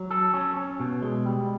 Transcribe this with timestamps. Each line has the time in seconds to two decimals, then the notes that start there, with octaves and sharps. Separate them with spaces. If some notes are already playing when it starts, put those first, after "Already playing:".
Already playing: F#3
0.11 A4
0.34 C#4
0.56 C#4
0.80 B2
1.02 G#3
1.25 G3